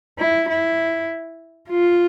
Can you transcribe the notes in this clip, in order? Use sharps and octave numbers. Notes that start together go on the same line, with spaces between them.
E4
E4
F4